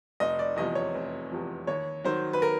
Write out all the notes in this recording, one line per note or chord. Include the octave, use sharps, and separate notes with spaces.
F1 D#5
D5
E2 C3 F3 D#5
C#5
F1
E2 C3 F3
D#2 C#5
D#3 F#3 C5
B4
A#4